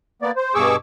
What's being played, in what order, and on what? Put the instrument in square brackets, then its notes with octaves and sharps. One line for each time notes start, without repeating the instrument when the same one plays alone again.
[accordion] A#3 B3 D5
C5
G2 B2 G#4 C#6 D6 E6